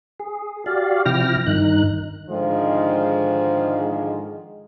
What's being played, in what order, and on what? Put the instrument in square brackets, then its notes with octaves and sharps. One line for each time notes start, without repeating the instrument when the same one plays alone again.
[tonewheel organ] G#4
F#4 G4 D5 F5
C3 F3 E4 G5 F6 A#6
G2 D#3 D#4 F#6
[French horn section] G#2 D3 D#3 F3 G#3